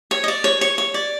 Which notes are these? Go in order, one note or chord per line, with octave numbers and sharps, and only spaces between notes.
C#5
D#5
D5
C#5
C#5
C#5
D5